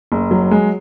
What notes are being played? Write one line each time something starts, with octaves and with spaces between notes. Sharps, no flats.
F#1
F#3
G#3